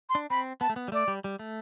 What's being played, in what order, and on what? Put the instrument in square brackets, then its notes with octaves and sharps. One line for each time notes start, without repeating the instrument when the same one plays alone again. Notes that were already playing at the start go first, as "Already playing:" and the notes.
[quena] C6
[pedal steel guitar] D4
[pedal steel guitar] C4 [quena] B5
[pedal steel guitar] B3 [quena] A5
[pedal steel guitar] A3
B3
G3
[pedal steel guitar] A3 [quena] D5
[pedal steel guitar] G3
G3
A3